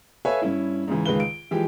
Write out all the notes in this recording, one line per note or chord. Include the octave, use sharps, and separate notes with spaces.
A4 B4 C#5 E5 F5 G#5
G2 C#4 E4
G#2 C#3 E3
C#2 D#3 G#3 B4 F5 G7
D7
E3 F3 G#3 G4